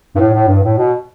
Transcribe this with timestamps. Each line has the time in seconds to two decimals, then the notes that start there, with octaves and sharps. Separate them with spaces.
0.15 G2
0.19 A2
0.34 A2
0.48 G2
0.63 A2
0.78 B2